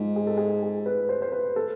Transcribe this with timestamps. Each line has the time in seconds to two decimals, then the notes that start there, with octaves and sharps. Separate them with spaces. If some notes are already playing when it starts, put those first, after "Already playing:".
Already playing: G#2 F4
0.16 G#4
0.27 A4
0.37 G#4
0.63 G#4
0.86 B4
1.09 C5
1.22 C5
1.32 B4
1.56 A4